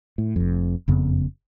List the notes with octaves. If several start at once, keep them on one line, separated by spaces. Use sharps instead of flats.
A2
F1 F2
F#1 F2 C#3 B3